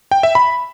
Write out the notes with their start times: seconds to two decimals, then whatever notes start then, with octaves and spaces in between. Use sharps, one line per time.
0.11 G5
0.23 E5
0.35 B5